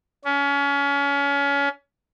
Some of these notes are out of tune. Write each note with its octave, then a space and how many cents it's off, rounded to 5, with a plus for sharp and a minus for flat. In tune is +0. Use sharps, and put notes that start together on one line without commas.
C#4 +30